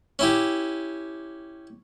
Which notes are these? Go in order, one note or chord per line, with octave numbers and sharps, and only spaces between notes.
C#4 E4 G4